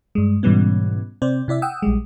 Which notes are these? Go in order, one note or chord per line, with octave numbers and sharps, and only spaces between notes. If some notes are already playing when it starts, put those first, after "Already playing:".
G2 G#3
G#2 B2 E3 G3 B3 C#4
C3 C4 C5 D5
C3 E4 D5 E5
F#5 G5 D#6 E6
A#1 G3 G#3